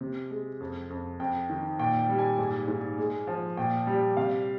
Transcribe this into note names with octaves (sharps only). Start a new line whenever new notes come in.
C3
G#3
F2
F2
F2 G5
D#3
A#2 G5
G5
G3
G#5
G#2 G#5
G#2
G#3
F3
A#2 G5
G3
C3 F5